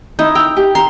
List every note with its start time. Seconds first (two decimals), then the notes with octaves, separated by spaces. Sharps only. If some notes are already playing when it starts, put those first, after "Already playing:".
0.19 D#4 E4 G6
0.35 G5 E6 F7
0.56 G4
0.75 A#5 C6